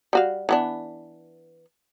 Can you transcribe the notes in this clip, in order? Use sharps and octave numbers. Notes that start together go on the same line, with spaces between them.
G3 F#4 F5
E3 B3 D4